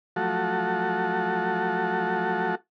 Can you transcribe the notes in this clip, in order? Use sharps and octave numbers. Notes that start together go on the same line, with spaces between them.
F3 F#3 A3 F#4 A4